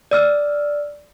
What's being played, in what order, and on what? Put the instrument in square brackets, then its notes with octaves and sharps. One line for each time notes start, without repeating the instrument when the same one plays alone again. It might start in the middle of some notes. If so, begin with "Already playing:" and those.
[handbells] D5 E6 F6